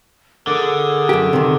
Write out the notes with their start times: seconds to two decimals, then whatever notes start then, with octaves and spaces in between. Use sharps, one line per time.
0.47 D3 G#4 A#4
1.09 F#2 G4
1.33 C3 D#3